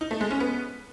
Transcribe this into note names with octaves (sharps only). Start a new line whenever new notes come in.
D#4
A3
G#3
C#4
B3